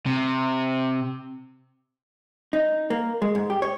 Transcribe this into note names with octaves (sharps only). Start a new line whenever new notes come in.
C3
D#4
A#3
G#3
G#2
G4
C#5